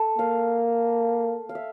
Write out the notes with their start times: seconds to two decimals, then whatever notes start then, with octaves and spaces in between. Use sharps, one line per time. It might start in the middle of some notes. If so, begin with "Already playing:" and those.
Already playing: A4
0.19 A#3 F5
1.49 F5
1.55 E5